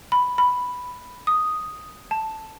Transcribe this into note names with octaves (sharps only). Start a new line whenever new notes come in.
B5
B5
D#6
A5